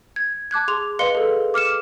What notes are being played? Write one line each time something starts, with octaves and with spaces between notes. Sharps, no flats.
G#6
A5 D6 F#6 G#6
G#4 C6 D6 F7
B4 D#5 F5 C6 C#7 G7
G#4 A4
D6 F6 C#7 E7